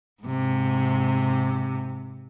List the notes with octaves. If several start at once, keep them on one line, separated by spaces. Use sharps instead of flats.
G#2 C3